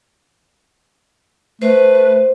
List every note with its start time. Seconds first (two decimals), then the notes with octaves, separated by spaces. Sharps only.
1.62 A3 B4 C5